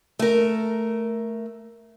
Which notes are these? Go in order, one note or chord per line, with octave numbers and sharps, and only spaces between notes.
A3 A#4